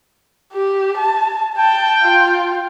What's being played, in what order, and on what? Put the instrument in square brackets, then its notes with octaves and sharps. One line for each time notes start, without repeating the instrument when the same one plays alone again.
[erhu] G4
A5
[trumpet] G5 [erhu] A5
[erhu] F4